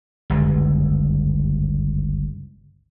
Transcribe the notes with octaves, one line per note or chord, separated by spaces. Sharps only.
G1 C#2 F#2